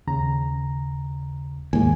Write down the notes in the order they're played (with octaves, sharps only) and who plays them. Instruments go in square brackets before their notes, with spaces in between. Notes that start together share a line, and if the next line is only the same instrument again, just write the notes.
[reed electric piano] D#2 C#3 A#5
[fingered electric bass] D#2 G#2 [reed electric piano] G#5